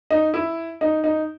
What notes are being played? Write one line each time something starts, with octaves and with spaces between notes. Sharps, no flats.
D#4
E4
D#4
D#4